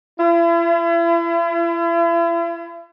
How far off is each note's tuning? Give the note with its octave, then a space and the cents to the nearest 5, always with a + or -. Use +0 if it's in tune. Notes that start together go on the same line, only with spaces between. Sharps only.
E4 +40